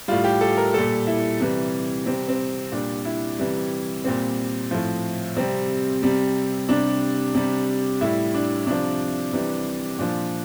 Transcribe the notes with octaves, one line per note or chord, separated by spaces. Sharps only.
A2 G3 F4
G4
A4
A#4
A#2 G3 A4
E4
C3 E3 G3
C3 G3 C4
C4
A#2 G3 D4
E4
C3 E3 G3
A#2 G3 C4
A2 F3
C3 G3 C4
C3 G3
C3 G3 D4
C3 G3
A2 G3 E4
D4
C3 F3 D4
C3 E3 G3
A#2 F3 D4